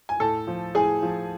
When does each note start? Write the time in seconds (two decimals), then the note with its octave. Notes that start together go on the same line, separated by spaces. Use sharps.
0.09 G#5
0.20 A2 A4 A5
0.47 F3
0.75 A2 G#4 G#5
1.02 F3